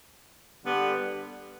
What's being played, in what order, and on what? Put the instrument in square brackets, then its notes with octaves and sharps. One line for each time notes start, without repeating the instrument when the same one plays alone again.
[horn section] D3 G3 B3